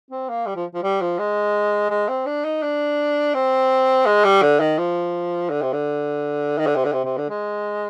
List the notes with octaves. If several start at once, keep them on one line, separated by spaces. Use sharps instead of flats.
C4
A#3
G3
F3
F3
G3
F3
G#3
G#3
C4
D4
D#4
D4
C4
G#3
G3
D3
D#3
F3
D3
C3
D3
D#3
D3
C3
D3
C3
C3
D3
G#3